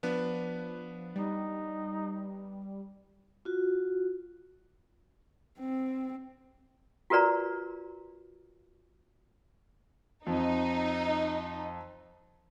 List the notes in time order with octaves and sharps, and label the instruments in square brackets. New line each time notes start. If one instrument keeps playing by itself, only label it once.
[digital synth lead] F3 [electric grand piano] B3 D4 B4
[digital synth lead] G3 [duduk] D#4
[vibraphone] F4 F#4
[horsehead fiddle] C4
[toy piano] F4 F#4 A#4 B4 D5 A#5
[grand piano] F2 [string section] D#4